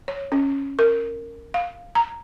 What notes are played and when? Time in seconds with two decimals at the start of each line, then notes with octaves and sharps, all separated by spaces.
0.08 C#5
0.32 C#4
0.79 A#4
1.54 F5
1.95 A#5